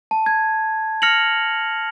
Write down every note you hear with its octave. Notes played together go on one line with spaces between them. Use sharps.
A5
G#6
F6 A#6 C#7 F7 F#7